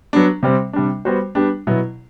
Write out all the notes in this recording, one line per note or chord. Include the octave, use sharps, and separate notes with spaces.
F#3 B3 D4
C3 G3 C4
C3 G3 D4
G3 B3 F#4 C5
G3 B3 D4 G4
B2 F#3 B3 E4